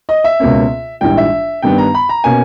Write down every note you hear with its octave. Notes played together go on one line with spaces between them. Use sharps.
D#5
E5
C#2 B2 A#3 C#4
A#1 G#2 E3 G3 G5
E5
G2 D#3 G3 B3 G5
A#5
B5
A#5
B2 A#3 C#4 G#5